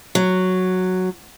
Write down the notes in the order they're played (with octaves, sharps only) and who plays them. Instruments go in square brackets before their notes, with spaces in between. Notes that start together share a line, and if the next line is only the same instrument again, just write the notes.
[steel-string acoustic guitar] F#3